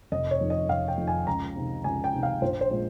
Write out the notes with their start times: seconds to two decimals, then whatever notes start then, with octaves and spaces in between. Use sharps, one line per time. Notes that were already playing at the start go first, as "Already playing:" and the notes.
0.12 F1 D#5
0.31 C#5
0.41 F2 D#3
0.50 D#5
0.69 F1 F5
0.88 G5
0.98 F2 D#3
1.07 G#5
1.27 C#2 A#5
1.56 C3 D#3
1.84 C#2 G#5
2.04 G5
2.13 C3 D#3
2.23 F5
2.42 A#1 C5
2.61 C5
2.70 A#2 F3 G#3